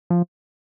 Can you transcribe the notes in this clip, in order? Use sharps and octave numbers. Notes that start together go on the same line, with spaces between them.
F3